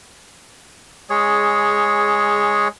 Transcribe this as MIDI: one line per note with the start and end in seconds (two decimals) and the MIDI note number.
1.10 2.68 56
1.10 2.68 68
1.10 2.68 73